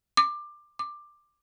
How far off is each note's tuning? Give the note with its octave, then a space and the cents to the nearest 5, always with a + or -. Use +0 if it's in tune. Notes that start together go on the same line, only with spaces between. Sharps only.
D6 +20
D6 +15